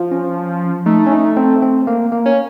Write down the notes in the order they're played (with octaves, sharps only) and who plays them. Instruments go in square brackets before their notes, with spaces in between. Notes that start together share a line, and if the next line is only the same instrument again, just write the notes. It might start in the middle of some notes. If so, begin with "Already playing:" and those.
Already playing: [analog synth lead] F3
[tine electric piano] C#4
[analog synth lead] A3 [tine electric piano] D#4
[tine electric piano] C#4
D#4
C4
C4
A#3
A#3
[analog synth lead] C#4